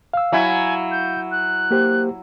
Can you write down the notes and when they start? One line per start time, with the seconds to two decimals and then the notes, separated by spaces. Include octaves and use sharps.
0.13 F5 E6
0.32 F#3 E4 G#5
0.91 G6
1.31 F#6
1.71 A#3 G4 C5